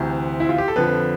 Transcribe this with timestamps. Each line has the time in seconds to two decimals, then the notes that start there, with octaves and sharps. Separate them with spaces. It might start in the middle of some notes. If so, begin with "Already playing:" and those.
Already playing: D2 C3 E3 C5
0.40 E4
0.49 F4
0.58 G4
0.68 A4
0.76 F2 D3 F3 B4